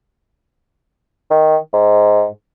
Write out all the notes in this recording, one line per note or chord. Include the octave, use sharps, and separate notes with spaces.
D#3
G#2